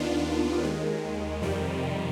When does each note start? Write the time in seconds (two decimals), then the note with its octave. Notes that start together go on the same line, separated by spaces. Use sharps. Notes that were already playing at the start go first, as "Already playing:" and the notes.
Already playing: D#2 D#3 B3 D4 F4
0.63 D#2 D#3 G#3
1.42 F2 C3 D#3 G3